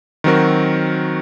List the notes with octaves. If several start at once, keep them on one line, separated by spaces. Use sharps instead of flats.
D#3 F#3 C4 F#4 A#4